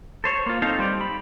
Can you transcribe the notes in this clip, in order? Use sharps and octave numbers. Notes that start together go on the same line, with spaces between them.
A4 C5 C#5
A#3 F4
C4 D#4 A4 C5 F5
G3 C5 D5
B5